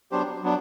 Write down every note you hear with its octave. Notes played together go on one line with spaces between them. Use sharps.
F#3 B3 D4 G4 C5
F#3 B3 D4